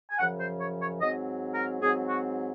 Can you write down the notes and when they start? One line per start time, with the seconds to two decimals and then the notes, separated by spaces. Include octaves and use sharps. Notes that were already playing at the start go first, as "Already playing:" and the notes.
0.11 G#5
0.18 F#2 C#3 F3 F#5
0.39 C5
0.60 C#5
0.80 C#5
1.00 G#2 F#3 C4 D#5
1.54 A#4
1.81 G#2 F#3 C4 G#4
2.08 F#4